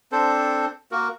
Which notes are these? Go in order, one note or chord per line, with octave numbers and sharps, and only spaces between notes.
C4 D4 A4 C5
A#3 F#4 A#4